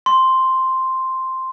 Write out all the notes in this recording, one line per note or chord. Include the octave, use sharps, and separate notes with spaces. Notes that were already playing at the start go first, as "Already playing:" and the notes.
C6